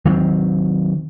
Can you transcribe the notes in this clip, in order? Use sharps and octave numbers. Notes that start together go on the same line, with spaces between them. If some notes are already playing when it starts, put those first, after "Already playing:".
D#3 F#3 B3 C4